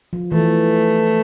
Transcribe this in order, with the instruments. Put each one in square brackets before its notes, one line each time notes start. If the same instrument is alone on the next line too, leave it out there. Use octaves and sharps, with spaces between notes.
[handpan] F3
[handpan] E3 [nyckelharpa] A3